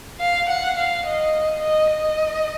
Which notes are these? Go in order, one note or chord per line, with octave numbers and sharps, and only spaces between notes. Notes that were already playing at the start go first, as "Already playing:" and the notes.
F5
F#5
F5
D#5
D#5
D#5